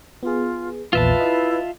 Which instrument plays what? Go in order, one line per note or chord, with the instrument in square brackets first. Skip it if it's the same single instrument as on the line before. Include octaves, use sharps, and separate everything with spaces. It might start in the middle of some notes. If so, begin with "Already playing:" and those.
[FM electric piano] B3 G#4 [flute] F4
[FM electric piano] A#1 E2 A#2 [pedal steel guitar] F4 E5 A5 [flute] B4
[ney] E4 [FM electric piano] D#5